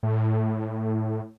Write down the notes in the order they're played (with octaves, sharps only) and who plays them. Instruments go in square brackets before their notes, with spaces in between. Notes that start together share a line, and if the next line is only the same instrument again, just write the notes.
[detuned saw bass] A2